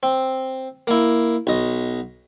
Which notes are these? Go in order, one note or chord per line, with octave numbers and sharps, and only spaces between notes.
C4
A#3 E4
B1 D#5